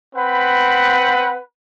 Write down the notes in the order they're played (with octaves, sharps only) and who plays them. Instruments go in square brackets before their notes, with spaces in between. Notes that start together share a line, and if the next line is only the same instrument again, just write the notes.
[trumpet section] C4 B4 F#5 B5